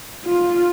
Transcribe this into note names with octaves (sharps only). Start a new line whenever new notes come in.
F4